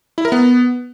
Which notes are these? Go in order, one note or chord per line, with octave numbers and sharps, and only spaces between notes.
E4
A#4
B3